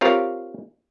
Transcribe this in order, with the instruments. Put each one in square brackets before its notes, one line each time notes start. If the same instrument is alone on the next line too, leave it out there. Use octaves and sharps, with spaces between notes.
[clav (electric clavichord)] C4 F4 G4 A#4 C#5 F5